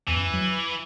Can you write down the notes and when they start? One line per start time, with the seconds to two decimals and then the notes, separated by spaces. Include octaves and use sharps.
0.08 E2 E3
0.16 F#2
0.34 F#3